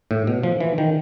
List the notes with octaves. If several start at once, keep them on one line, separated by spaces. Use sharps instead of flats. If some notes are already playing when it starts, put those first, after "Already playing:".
A2
B2
F3
E3
D#3